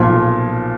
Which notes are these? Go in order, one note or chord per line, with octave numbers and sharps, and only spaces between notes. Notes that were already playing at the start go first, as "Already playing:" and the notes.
Already playing: B1 A#2 F3